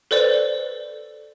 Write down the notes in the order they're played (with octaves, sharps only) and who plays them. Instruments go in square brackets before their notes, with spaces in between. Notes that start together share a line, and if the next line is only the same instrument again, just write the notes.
[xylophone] A4 B4 C5 D5